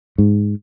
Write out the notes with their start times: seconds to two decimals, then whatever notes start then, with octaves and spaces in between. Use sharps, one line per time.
0.18 G#2